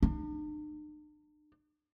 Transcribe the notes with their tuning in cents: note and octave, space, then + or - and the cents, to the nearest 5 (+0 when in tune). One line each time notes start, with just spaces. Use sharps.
D4 +45